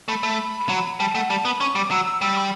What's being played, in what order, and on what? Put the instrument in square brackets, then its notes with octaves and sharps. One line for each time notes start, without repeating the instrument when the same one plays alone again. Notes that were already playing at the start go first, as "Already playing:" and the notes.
[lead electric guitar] A3 [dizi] B5
[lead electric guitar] A3
F#3
[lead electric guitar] G3 [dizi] A5
[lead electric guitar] A3 [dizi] F#5
[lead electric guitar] G3 [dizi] A5
[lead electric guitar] B3 [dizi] B5
[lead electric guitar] C#4 [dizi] C#6
[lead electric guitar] G3 [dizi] D6
[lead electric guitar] F#3 [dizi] E6
[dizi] E6
[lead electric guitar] G3 [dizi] E6
[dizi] B5